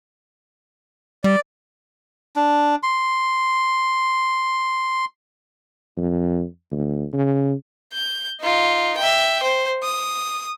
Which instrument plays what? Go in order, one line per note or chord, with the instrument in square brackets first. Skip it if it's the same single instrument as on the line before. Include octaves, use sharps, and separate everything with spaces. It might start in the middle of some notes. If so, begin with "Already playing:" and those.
[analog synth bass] G3 [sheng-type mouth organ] D5
[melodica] D4
C6
[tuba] F2
D2
C#3
[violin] G6
D#4 F4
E5 G5
C5
D#6